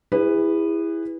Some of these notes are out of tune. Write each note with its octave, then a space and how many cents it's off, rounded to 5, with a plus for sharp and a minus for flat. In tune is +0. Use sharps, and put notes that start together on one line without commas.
E4 +0 G#4 -35 B4 +0